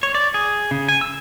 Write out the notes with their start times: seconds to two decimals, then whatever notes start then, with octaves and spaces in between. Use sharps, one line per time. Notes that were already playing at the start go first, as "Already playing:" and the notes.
0.03 C#5
0.15 D5
0.34 G#4
0.71 C#3
0.89 G#5
1.01 E6